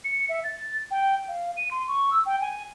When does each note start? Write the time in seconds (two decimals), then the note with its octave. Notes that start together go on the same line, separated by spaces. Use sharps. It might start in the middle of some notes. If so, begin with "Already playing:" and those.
0.04 C#7
0.29 E5
0.44 A6
0.91 G5
1.28 F5
1.57 D#7
1.71 C6
1.88 C#6
2.11 E6
2.26 G5
2.41 G#5